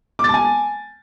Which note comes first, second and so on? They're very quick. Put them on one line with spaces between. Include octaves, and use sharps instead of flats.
D6 A6 A5 G#5